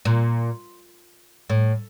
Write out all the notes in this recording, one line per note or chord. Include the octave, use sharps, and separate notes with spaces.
A#2
A2